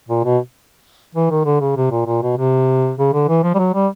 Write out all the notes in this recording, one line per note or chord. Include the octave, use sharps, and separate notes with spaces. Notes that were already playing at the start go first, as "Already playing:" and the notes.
A#2
B2
E3
D#3
D3
C#3
C3
A#2
A#2
B2
C3
C#3
D3
E3
F3
G3
F#3
G3